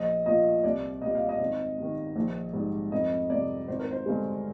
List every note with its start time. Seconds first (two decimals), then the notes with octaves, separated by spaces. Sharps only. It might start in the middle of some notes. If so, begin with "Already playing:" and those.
Already playing: A#1 D#5
0.26 A#2 F3 D#5
0.64 C2 D5
1.02 A#2 G3 D#5
1.15 F5
1.29 D#5
1.40 G#1
1.78 G2 D#3
2.16 A#1
2.53 G#2 G3
2.92 F2 D#5
3.30 C3 G3 D5
3.68 G#1 C5
3.79 A#4
3.91 C5
4.06 G2 D3 G#3